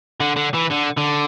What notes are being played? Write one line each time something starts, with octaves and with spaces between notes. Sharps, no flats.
D3
D3
E3
D3
D3